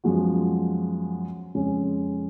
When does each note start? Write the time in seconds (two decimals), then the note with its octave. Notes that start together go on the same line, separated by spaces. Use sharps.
0.04 F#2 F3 G#3 B3 F#4
1.55 F2 C#3 G#3 C#4